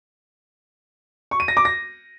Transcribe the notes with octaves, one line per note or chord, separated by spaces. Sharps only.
C#6
D#7
A#6
D6
A#6